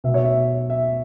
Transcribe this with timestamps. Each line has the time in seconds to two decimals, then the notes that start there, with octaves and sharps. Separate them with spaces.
0.04 B2 B3 E5
0.14 C#5
0.24 E5
0.70 E5